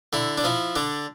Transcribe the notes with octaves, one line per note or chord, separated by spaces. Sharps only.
D3 E4
D4
F3 E4
D3 D4